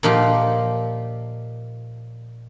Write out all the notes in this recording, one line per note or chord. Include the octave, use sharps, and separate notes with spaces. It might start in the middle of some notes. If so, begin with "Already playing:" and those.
A#2 F3 D#4 F4 G4